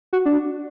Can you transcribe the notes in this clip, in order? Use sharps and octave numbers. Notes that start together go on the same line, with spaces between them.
F#4
D4